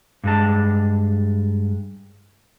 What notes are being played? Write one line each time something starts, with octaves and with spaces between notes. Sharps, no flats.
G2 G#3 A5